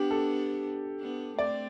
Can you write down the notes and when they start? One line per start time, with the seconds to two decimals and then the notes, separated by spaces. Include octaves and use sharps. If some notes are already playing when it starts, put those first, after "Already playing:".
Already playing: B3 D4 G4
0.11 A4
1.00 B3 D4
1.38 A3 C4 D5